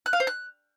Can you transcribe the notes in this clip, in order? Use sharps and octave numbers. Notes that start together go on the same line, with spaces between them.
F#6
F5
C5
F#6